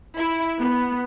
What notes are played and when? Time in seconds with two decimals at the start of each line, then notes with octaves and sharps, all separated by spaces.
0.17 E4
0.60 B3